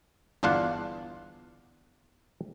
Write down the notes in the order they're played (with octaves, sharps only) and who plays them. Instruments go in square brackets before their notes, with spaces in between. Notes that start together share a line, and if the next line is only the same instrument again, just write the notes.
[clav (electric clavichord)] G1 E2 D4 F4 F5 F#5